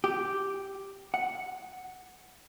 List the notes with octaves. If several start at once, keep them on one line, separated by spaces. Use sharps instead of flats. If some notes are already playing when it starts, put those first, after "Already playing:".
G4
F#5